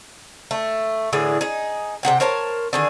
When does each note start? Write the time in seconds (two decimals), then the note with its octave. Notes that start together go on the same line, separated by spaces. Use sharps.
0.51 A3
1.13 A2 D3 E3 G#4
1.41 D#4 G#4
2.03 C3 A#3 F#5 G5
2.20 A#4 C5 C#5 A5
2.73 D3 D#3 G#4